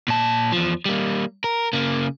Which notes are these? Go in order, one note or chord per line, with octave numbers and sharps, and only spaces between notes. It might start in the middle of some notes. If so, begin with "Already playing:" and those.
A#2 A5
E2 F3
G3 A#3
A#4
C#3 A#3